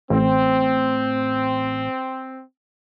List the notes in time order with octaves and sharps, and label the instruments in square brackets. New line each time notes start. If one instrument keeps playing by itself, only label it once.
[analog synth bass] A1 [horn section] C4